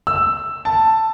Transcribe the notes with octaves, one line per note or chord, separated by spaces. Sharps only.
E6
A5